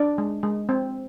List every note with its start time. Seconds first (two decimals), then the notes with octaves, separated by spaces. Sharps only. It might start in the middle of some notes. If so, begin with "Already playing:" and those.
Already playing: D4 D5
0.18 G#3
0.43 G#3
0.69 C4